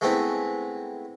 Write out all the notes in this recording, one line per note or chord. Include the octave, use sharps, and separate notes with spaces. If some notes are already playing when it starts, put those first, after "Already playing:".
G#3 A3 B3 C4 E4